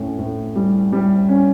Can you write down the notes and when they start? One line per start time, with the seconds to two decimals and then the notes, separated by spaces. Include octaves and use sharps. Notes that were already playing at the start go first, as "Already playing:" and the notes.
Already playing: A2 C#4
0.19 A2
0.55 G3
0.92 G3
1.29 C#4